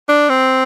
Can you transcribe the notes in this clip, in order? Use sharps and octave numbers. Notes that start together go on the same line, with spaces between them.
D4
C4